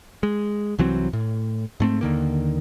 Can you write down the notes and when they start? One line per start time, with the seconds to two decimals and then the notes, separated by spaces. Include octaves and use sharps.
0.23 G#3
0.79 C2 E3 F#3 C4
1.13 A2
1.80 G#2 A3 C4
2.01 D#2 D3 D#3 A#3